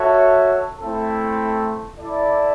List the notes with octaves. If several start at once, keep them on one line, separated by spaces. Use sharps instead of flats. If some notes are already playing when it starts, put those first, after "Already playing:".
Already playing: F#4 A4 C#5 E5
A3 C4 E4 A4
E4 A4 D5